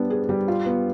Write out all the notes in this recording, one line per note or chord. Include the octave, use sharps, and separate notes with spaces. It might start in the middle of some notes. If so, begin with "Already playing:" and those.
Already playing: G3 B3 D4
G#4
G3
F4
B3